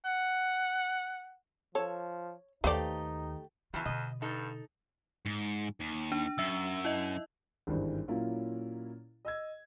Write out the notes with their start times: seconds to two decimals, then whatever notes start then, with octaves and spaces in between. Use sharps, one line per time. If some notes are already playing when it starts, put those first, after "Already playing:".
0.05 F#5
1.75 F3 A4 C#5
2.64 D#2 A3 D#4 G4 B4 C5 D5 F5
3.74 F2 B2 E3 G3 F4
3.86 B2 D3 D#5
4.22 G2 D#4 A4
5.26 G#2
5.80 D#2
6.12 D4
6.38 F#2 E5 E6
6.85 E4 D#5
7.67 G#1 G2 E3 G3 C5
8.08 A#2 F#3 A#3 C#4 E4 F4
9.25 D#5 E6 G#6